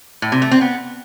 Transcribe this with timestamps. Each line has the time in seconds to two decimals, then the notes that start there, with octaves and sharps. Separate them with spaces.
0.22 A2
0.32 C3
0.42 A3
0.51 C4
0.61 B3